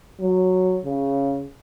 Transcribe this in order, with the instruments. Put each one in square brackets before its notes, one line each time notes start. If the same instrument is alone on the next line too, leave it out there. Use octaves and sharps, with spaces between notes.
[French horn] F#3
C#3